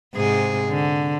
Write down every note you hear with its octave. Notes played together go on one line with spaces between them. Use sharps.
G#2 C3 G#4
D3